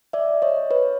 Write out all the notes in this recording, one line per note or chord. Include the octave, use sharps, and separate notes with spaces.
D5 E5
C#5 D#5
B4 C#5